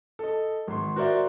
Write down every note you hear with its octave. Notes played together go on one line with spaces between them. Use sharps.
A4 D#5
G#1 C6
F#4 A#4 C5 D5 E5